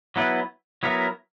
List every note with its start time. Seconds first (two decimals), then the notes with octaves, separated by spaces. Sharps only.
0.16 F#3 B3 E4 B4
0.83 F#3 B3 E4 A#4